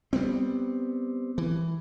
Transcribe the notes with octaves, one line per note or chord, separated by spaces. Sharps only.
G3 B3 C4
E3